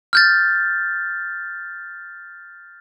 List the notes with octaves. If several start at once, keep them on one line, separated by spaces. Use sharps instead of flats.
F6 G6 A6